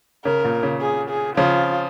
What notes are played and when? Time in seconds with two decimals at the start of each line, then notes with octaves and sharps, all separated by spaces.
0.25 C#3 A#4
0.44 A#2
0.63 C#3
0.81 G#4
1.10 G#4
1.37 C#3 F3 F4